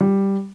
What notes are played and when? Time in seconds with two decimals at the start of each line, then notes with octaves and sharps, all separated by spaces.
0.01 G3